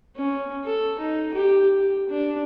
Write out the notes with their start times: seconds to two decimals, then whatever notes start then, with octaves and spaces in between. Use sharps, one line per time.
0.16 C#4
0.65 A4
0.99 D#4
1.34 G4
1.79 G4
2.09 D4